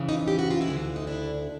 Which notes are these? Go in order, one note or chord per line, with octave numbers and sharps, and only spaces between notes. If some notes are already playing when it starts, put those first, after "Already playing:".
Already playing: F2 C#3 E3
D#4 F4
G4
F#4
F4
E4 F#4
D2 D3
D#4
D4 E4